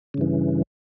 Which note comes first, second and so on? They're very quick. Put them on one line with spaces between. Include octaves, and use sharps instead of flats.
C#3 G2 E3